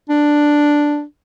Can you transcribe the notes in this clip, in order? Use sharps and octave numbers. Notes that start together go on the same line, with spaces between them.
D4